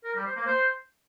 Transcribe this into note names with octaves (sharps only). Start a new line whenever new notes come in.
A#4
G3
C5
A#3
C5